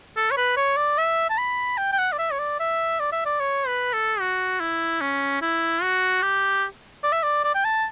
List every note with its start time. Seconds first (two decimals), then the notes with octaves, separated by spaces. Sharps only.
0.16 A4
0.31 C#5
0.37 B4
0.57 C#5
0.77 D5
0.98 E5
1.29 A5
1.38 B5
1.78 G5
1.92 G5
1.99 F#5
2.12 D5
2.18 E5
2.32 C#5
2.39 D5
2.60 E5
2.99 D5
3.12 E5
3.25 D5
3.40 C#5
3.67 B4
3.93 A4
4.20 F#4
4.60 E4
5.01 C#4
5.42 E4
5.83 F#4
6.22 G4
7.03 D5
7.12 E5
7.23 D5
7.44 D5
7.55 G5
7.64 A5